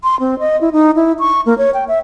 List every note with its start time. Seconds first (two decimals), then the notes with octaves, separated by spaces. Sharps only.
0.04 C6
0.20 C4
0.39 D#5
0.61 E4
0.73 D#4
0.96 E4
1.19 C#6
1.46 A#3
1.58 C#5
1.74 G5
1.88 E5